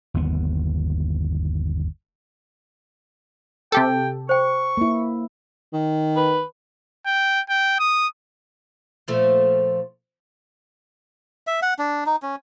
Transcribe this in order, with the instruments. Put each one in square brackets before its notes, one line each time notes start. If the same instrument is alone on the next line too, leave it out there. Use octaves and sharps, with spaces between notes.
[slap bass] G1 D#2 B3
[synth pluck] C3 G4 A4 [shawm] G5
[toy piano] C5 G5 [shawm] C#6
[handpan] A#3 E4
[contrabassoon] D#3
[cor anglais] B4
[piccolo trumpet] G5
G5
D#6
[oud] A#2 F3 A3
[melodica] E5
F#5
D4
D#4
C#4